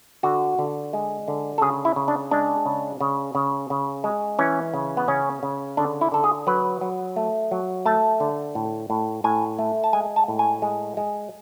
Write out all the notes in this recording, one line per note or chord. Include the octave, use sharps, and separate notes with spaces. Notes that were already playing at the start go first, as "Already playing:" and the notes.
D3 F#4
D3
G#3
D3
A4
C#3 G#4
E4
C#3
D4
G#3 D4
C#3
C#3
C#3
C#3
G#3
E3 C#4
C#3
B3
C#3 C#4
C#3
D3 D4
E4
D3 A4
G#4
F#3 B4
F#3
A3
F#3
A3 A5
D3
A2
A2
A2 G#5
A3
A5
G#3 G#5
A5
A2
G#5
G#3
G#3